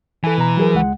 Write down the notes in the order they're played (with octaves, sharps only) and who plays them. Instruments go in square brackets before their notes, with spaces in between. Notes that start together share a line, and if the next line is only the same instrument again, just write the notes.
[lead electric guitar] E3 [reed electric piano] A4 G#5
[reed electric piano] B2 A#5
F#3 G#4 A#4
C#2 G#3 F#5